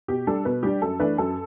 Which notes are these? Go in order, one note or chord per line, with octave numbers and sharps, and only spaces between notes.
B2 G4
G3 D4 A4
B2 B4
G3 D4 G4
F#2 A4
E3 A3 D4 B4
F#2 A4